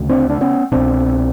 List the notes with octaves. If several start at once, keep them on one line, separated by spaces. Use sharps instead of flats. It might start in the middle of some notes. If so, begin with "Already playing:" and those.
Already playing: D2 C#3
C4 D4
D4
B3 C#4
C2 B2 C4 D4